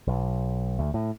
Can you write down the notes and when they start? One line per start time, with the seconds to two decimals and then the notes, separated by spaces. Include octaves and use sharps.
0.07 B1
0.79 D2
0.94 A2